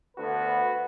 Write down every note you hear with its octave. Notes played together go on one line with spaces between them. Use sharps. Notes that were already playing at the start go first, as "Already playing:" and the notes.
D2 D3 B3 F#4 B4